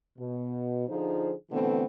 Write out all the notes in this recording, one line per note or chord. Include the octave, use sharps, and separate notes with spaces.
B2
D3 F3 D#4 F4 G#4 C5
B2 D3 E3 A3 B3 C4